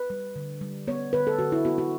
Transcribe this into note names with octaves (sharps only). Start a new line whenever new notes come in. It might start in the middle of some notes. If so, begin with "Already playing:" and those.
Already playing: B4
G3
D3
G3
B3 C#5
D3 B4
A4
D3 F#4
E4
B3 F#4
F#4